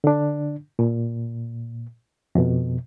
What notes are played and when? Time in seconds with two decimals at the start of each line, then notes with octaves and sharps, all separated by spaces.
0.04 D3 D4
0.79 A#2
2.35 F2 B2